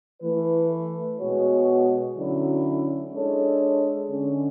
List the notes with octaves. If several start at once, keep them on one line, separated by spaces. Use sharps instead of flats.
E3 A3 E4 B4
B2 G#3 B3 F#4 C#5
D3 F#3 C#4 E4
G#3 D4 A4 C#5
D3 G#3 C#4